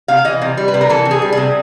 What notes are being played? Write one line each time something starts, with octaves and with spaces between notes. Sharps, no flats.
C3 F5
E3 D#5
C3
G3
B4
C3
A#4
E3 A4
C3
G#4
G3
C3 G#4